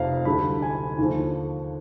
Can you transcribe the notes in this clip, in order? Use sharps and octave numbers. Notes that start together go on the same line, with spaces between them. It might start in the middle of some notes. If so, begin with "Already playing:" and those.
Already playing: F1 F2 C3 F3 F5
D2 D3 G3 B5
G#5
D#2 D3 F3